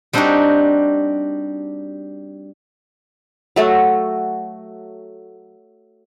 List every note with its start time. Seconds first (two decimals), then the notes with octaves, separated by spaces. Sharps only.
0.13 G3 C4 D4 D#4 F#4 G4
3.56 F#3 A3 F#4